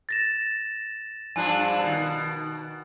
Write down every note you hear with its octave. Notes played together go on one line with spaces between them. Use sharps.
A6 A#6 E7
G2 F3 D4 G#5 F#6
B2 D#3